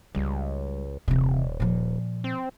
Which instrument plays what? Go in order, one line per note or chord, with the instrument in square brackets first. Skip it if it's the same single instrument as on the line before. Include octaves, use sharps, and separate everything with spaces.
[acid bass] C#2 [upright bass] G3
[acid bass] D#1 [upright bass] C3 E3
[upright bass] A#2 F3
[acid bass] C4